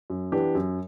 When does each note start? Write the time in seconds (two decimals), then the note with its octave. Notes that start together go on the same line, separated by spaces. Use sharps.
0.10 F#2
0.32 E3 B3 D4 G4
0.55 F#2